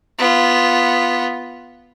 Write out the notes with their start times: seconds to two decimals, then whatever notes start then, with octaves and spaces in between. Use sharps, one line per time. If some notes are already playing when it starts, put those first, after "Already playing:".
0.19 B3 F4